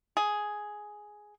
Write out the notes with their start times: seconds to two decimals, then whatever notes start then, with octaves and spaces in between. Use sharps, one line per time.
0.17 G#4